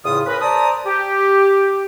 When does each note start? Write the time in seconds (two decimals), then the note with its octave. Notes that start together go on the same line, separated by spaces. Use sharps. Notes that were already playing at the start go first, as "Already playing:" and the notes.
0.05 E2 A2 C#3 F4 D#6
0.26 C#4 A#4 B4
0.41 C5 D5 A5 A#5 D#6
0.85 G4